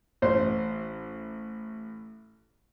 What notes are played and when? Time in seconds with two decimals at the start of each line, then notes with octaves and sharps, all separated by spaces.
0.22 A1 C5